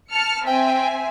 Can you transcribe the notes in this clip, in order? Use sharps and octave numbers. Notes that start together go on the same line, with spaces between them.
A5 F6 C#7
C4 E5 G5 G#5